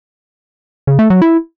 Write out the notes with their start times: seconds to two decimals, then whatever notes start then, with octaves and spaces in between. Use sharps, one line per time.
0.87 C#3
0.99 A3
1.10 F#3
1.22 E4